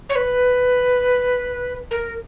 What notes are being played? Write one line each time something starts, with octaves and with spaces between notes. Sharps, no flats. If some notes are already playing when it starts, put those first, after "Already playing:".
C#5
B4
A#4